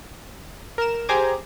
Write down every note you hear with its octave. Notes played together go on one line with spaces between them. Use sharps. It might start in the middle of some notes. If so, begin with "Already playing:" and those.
A#4 E7
G4 G#4 C5 A#5 D6 G#6